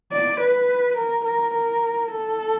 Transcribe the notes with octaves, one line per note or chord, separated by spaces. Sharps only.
D5
B4
A#4
A#4
A#4
A4